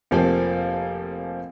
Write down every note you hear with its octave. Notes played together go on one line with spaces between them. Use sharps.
F1 F3 A#3 C4